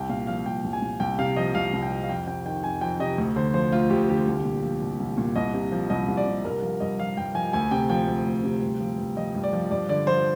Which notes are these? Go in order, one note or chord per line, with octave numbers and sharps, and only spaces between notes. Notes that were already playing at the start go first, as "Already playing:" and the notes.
Already playing: C2 G5
A#2 F5
F3 F5
C2 G5
C2
G#5
A#2
C2 G5
C3 F5
F3 D#5
C2 F5
C2
G5
C3
F5
F2 G5
C3 G5
D#3 G5
F2 G#5
F2 G5
C3 D#5
D2
D3 C5
F3 C5
D2 F4
D2 G4
D3 G4
C2
A#2
F3
C2
C2
A#2
C2 D#5
C3
F3
C2 D#5
C2
D5
C3
G2 A#4
F3
G2 D#5
F3 F5
G2 G5
F3 G#5
D2 G#5
C3 G5
F3 G5
D2
D2
C3
G2
F3
G2
F3 D#5
G2
D5
F3
G2 D5
D3 D5
F3 C5